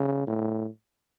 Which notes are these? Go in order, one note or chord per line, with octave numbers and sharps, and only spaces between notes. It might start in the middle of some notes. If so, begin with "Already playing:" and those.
Already playing: C#3
A2